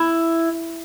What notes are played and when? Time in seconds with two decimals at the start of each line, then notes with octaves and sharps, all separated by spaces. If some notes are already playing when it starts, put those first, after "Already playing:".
Already playing: E4